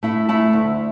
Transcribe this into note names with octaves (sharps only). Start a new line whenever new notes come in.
A3 E4 E5
A3 E4 A5
D2